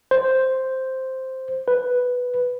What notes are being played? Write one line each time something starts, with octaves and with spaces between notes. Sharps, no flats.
C5
B4